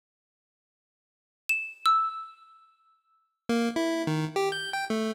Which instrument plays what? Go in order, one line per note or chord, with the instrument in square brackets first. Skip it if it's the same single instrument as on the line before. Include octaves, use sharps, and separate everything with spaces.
[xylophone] E7
E6
[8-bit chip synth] A#3
E4
D#3
G4
G6
G5
A3